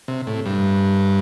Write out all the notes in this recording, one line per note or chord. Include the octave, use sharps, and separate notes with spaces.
C3
A2
G2